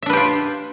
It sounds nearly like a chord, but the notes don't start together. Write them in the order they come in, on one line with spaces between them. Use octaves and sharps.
E5 D4 B4 G4 F4